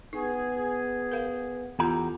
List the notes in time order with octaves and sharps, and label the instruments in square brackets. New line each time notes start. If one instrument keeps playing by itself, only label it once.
[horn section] B3 G#4 [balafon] D#4
[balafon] A#4 F5 F#5
[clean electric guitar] E2 G4 A#5 [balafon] B3 F4 A4